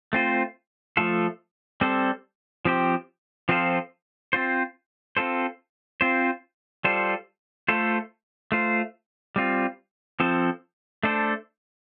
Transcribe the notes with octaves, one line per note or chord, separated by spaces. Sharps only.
A3 C4 F4 C5
F3 A3 F4 A4
G3 C4 A4 C5
F3 C4 G4 C5
F3 C4 F4 A4 C5
C4 F4 C5
C4 F4 A4 C5
C4 F4 C5
G3 F4 A4 C5
A3 F4 A4 C5
A3 F4 C5
G3 C4 F4
F3 C4 A4 C5
A3 D4 A4 C5